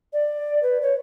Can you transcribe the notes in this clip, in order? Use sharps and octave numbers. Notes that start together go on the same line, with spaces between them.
D5
B4
C#5